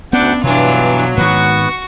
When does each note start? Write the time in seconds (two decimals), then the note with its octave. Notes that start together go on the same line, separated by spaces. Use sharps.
0.13 D2 B3 C#4 D4 E4 D5 F#5 G6
0.43 G2 B2 E3 F#3 D4 F4
1.17 G#2 D#3 B3 F#4 B4 C#6